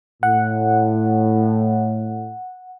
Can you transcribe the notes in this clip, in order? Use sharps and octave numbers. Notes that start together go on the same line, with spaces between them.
A2 F#5